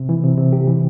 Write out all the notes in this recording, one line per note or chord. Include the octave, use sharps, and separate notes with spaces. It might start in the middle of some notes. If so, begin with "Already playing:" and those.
Already playing: C3
E3
C3
C3
G4
E3